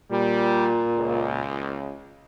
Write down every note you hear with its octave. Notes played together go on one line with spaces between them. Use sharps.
A#2 G3
C#2